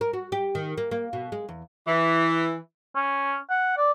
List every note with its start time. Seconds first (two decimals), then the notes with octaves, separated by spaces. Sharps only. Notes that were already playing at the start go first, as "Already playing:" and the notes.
0.01 A#4
0.13 F#4
0.32 G4
0.55 D#3
0.77 A#3
0.91 A#3
1.13 B2
1.32 G#3
1.49 E2
1.87 E3
2.95 C#4
3.50 F#5
3.77 D5